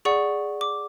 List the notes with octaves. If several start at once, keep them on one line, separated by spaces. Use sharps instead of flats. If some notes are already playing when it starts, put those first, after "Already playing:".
G#4 D5 F#5 C#6
D6